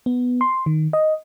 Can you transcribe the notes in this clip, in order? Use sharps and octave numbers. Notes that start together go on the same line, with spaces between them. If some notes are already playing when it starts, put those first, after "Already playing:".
B3
C6
D#3
D#5